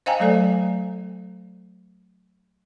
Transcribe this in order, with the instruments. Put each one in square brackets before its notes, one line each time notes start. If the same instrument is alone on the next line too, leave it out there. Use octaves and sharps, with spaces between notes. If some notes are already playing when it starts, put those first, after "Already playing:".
[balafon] C5 D#5 F5 G5 G#5 A#5
F#3 A3 A4 D5